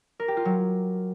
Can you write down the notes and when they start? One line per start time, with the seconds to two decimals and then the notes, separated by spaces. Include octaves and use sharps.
0.20 A#4
0.28 G4
0.37 F4
0.45 F#3